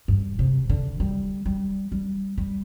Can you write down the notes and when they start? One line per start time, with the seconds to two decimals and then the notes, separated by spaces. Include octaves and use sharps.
0.08 G2
0.39 C3
0.69 D3
1.00 G3
1.46 G3
1.92 G3
2.38 G3